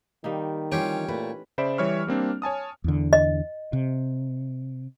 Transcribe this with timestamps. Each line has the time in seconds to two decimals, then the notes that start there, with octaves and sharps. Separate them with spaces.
0.24 D#3 G3 A#3 D#4
0.72 E3 G3 C4 C#4 F4 G4 C#5 G5
1.08 A#2 A3 B4
1.58 C#3 C5 D5 E5 B5 D7
1.78 E3 G3 C#5 E5 C#6 F6
2.07 G3 A#3 C4 D4
2.42 C#5 G#5 A5 D#6
2.84 E2 D3
3.13 D#5
3.73 C3